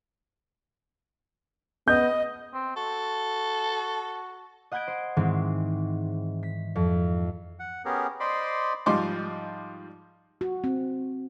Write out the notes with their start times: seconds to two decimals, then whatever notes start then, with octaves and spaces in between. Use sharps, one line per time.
1.88 B3 D#5 G6
2.54 C4
2.77 F#4 A4
4.72 D#5 F#5 B5 G6 G#6 D7
4.88 C5
5.17 G#2 D#3 E3 G#3 C4
6.43 B6
6.76 F2
7.59 F#5
7.85 B3 C#4 G4 G#4 A#4
8.20 C5 D5 D#5 B5 C6 D6
8.86 G#2 F3 G3 D#4 C6 D6
10.41 F#4
10.64 C4